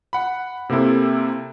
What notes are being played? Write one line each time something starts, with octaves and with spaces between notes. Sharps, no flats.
F#5 B5
C3 A#3 C4 E4 A4